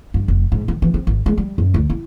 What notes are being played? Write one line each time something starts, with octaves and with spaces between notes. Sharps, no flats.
G2
F1
G#2
D#3
E3
C4
G#1
G#3
G3
F#2
D2
E4